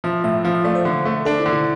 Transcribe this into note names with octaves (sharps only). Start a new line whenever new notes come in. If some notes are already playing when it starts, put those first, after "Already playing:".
F3 E5
A2 E5
F3 F5
E5
A3 D5
C5
D3
A3
D4 A4
E4
D3
E4